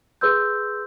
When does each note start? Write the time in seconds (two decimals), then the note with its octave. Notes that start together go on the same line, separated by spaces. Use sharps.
0.21 G#4 B4 C6 E6 G6